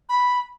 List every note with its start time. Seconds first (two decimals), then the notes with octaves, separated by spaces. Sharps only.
0.09 B5